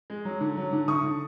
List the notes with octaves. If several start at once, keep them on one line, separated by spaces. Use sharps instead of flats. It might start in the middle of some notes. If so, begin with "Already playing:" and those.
G#3
F#3
D3
F#3
D3
D3 C#6 D#6
D3